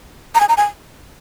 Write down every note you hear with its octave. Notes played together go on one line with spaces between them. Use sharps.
A#5
G#5
A#5
G#5